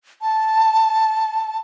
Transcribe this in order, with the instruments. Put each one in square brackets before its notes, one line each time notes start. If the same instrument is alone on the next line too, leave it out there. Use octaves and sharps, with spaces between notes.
[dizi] A5